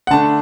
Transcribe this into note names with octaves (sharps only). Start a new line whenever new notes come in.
F#5
D3 A3 D4 A5